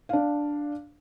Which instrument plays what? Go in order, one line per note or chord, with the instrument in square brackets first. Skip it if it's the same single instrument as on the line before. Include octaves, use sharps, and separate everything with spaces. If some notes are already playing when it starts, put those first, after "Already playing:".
[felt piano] D4 F5